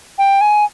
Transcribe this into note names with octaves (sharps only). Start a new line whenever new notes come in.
G5
G#5